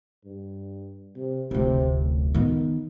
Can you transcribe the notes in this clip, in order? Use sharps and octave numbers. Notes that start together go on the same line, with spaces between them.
G2
C3
F1 D2 C3
F#2
D#3 B3